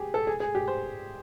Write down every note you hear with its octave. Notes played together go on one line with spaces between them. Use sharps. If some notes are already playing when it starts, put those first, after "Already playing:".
Already playing: G4 G#4
A4
G#4
G#4
G4
C5